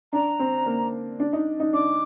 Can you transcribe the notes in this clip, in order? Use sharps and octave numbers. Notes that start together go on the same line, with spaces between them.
D4 A#5
C4
A#3
D4
D#4
D#4
D4 D6